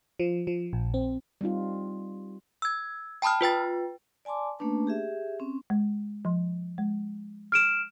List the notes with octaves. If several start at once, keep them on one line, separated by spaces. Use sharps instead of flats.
F3
F3
A#1
C4
G3 C4 D#4 F4
E6 G#6
G5 A5 B5 D#6 F6
F4 B4 G5 A6
D5 G#5 A5 C6 D6
A3 A#3 C#4 D4 B4 A5
G4 G#4 E5
C4 C#4
G#3
F3 C6
G#3
F6 D7 E7